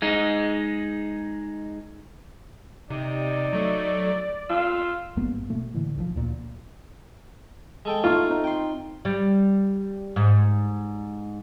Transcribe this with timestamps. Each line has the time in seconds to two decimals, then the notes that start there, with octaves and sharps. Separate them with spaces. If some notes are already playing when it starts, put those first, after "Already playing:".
0.02 G#3 D#4
2.90 C3 D#4 D5
3.53 F#3 A3
4.49 F4 E6
5.16 G#1 G2 A#3 B3
5.50 B2 A3 A#3
5.74 A2 D3 E3
5.96 B1 D#3 F3
6.16 D2 A#2
7.85 G#3 A4 G5
8.04 A3 D#4 F4 C#5
8.30 C4 D#4
8.44 G5 C6
9.05 G3
10.16 G#2